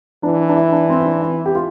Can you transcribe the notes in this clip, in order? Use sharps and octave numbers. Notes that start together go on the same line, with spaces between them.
E3 D4
D4
E4
D4
C4
C4
D4
E4
G4
F4